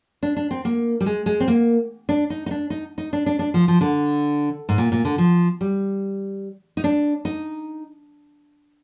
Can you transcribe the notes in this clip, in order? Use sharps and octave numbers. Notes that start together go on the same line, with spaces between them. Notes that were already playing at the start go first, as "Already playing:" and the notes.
D4
D4
C4
A#3
G3
G#3
G#3
C4
A#3
D4
D#4
D#4
D4
D#4
D#4
D4
D4
D4
F3
F3
D3
G#2
A#2
A#2
D3
F3
G3
D#4
D4
D#4